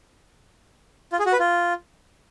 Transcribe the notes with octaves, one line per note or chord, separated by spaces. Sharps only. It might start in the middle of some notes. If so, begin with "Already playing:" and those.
F4
G#4
F#4
B4
F4